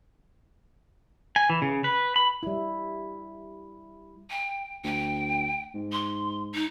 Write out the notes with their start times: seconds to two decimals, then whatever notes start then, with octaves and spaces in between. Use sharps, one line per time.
1.36 G#5
1.50 E3
1.62 C#3
1.84 B4
2.16 B5
2.43 G3 E4
4.30 G5
4.84 D2 G5
5.74 G#2
5.92 C6
6.54 D#4